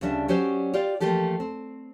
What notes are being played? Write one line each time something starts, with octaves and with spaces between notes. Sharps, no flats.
D2 C#3 G3 D4 E5
F#3 C#4 G4 C5 D5
F4 G4 D5
E3 F3 A3 A#3 G4 A4
C4